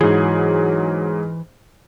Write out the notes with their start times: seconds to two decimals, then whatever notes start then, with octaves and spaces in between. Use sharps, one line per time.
0.01 G#2 E3 F#3 G#4